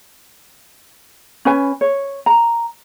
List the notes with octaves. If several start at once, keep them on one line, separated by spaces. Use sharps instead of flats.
C#4 B4 G#5
C#5
A#5